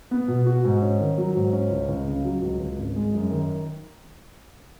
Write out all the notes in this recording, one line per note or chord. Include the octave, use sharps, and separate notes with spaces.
B3
B2
F#4
G#2
C#4
D#3
F#3
G#2
C#4
C#2
C#2
C#3
F#3
C#2
C#2
G#1
G#3
F#2
D#3